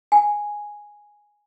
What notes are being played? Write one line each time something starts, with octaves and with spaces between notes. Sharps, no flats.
G#5